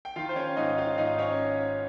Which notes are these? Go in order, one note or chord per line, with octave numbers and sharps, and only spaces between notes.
G5
D#3 F4 F5
C5
C#4 C#5
G#2 D#4 D#5
F4 F5
G#1 D#4 D#5
C#4 C#5